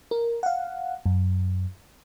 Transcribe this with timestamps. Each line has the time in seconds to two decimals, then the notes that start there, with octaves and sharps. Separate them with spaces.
0.11 A#4
0.43 F5 F#5
1.06 F#2